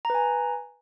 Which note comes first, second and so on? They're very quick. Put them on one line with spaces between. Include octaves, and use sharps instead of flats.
A#5 B4 G#5